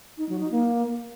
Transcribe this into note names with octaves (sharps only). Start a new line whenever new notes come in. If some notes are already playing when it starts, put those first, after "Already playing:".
D#4
F#3
D#4
A#3